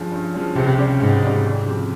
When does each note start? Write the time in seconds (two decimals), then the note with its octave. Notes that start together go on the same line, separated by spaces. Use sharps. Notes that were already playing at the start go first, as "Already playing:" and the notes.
Already playing: G2 F3 G#3 C#4
0.11 G2
0.34 F3 G#3 C#4
0.56 C#2 C3
0.78 C#3 G3 C#4 G4
1.00 C#2 G#2
1.22 C#3 G3 C#4 G4
1.44 F2
1.66 C#3 F3 C4 G4